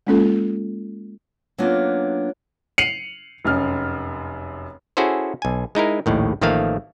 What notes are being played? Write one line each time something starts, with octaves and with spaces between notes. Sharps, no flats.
G#3 A#3 C#4 F4 A4
F#3 A#3 B3 C#4 D4 F4
C7 C#7 D#7 F7 F#7
F1 F#2 F6
C#4 E4 F#4 G#4 A4 C5
B1 G#5
G#3 D#4 E4 A#4
A#1 D#2 A2 D#3
A1 D#3 F3 A3 A#3 F5